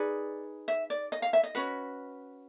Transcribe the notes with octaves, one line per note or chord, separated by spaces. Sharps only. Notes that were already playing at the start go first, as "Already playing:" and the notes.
Already playing: D#4 G#4 B4 D5
E5
D5
D#5
F5
E5
D#5
C#4 F#4 B4